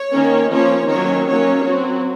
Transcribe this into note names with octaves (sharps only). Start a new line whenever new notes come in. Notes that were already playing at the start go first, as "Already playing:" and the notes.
Already playing: C#5
D#3 A#3 C#4
F3 A#3 C#4 C#5
D#3 F#3 A#3 C#4 C#5
F#3 A#3 C#4 C#5
F#3 C4 F#4